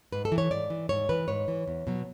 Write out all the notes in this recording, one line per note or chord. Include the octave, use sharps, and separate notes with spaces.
G#2 B4
A4
E3
C#5
G#2 D5
E3
G#2 C#5
E3 B4
G#2 C#5
E3
E2
B2 F#3